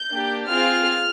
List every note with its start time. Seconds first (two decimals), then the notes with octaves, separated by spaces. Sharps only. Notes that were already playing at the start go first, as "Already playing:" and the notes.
Already playing: G6
0.12 A#3 D4 G4
0.50 C4 F4 G#4 F6